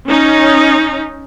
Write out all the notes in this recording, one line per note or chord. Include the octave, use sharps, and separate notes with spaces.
C#4 D#4